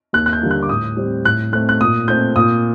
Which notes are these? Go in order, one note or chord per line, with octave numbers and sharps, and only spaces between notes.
D#2 F#6
F#6
G6
D3 G3 A#3
F#6
D6
A2 D#6
G3 C4
A2 F#6
A3 C4 F#6
F#6
A#2 D#6
A3 C4 G6
A#2 D#6